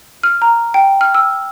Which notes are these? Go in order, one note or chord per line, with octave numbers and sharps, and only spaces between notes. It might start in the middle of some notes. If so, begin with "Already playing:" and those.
F6
A#5
G5
F6
E6